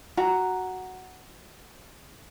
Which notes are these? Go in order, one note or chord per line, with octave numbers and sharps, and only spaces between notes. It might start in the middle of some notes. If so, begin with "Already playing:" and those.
F#4 A#5